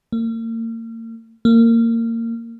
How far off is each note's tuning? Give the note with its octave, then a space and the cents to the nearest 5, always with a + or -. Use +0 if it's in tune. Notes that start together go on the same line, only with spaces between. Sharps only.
A#3 -40
A#3 -25